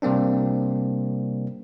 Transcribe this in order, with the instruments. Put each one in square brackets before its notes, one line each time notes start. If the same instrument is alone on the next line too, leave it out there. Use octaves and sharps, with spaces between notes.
[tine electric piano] C3 G3 A#3 C4 D4